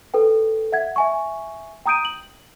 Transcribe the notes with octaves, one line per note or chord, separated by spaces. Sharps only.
A4 B4 G5
E5 F#5 G#6
E5 G#5 C#6
G5 A#5 D#6 G6 D7 D#7
F#7